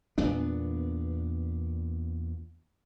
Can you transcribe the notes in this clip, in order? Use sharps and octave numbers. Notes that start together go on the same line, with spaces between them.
E2 A#2 B3 D4